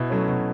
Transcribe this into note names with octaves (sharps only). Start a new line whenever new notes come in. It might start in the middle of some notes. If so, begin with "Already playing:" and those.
Already playing: B2 E4
F#3 A3 C#4
B2